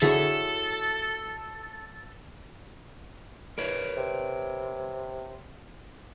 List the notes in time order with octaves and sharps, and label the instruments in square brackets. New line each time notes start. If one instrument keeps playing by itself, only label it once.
[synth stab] D3 G#4 [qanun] E4 F#4 C#5 [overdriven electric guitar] A4
[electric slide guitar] A#4 B4 C#5
[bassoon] C3